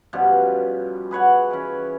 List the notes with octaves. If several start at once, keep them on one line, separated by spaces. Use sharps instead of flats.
G2 B2 F3 C#4
G#4 B4 C#5 F#5
E3 C#4